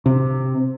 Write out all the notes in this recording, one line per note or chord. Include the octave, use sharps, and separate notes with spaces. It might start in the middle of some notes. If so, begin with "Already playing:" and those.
C3